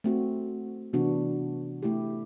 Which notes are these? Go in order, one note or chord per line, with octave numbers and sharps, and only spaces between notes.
A3 C4 F#4
C3 E3 B3 D4 F#4
A3 E4 G4